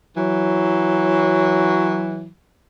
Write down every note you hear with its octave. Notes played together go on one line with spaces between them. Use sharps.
E3 F#3